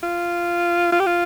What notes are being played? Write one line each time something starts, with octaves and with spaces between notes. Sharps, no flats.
F4
F4
G4
F4